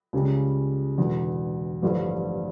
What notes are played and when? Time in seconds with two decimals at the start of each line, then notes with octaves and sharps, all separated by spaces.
0.13 C#2 C#3 G3
0.98 E1 E2 D3
1.82 A1 G2 D3 F3